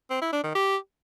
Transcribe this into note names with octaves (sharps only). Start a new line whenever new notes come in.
C4
E4
D4
D#3
G4